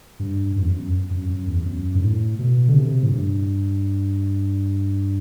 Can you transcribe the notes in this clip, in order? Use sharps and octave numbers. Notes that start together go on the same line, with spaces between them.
G2
F#2
E2
F#2
F#2
F#2
E2
F#2
G2
A2
B2
D3
C3
A2
G2